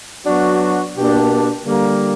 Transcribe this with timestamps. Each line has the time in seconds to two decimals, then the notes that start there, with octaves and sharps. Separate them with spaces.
0.25 F#3 B3 D4 F#4
0.95 B2 A#3 D4 G4
1.64 D3 G3 A#3